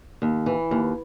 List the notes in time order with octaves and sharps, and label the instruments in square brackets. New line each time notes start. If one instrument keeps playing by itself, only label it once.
[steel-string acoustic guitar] D#2
E3
D#2